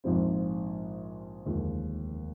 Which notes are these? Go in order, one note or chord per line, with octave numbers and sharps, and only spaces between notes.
A#1 G#2 F3 C4
F1 D#2 D3 F3 G#3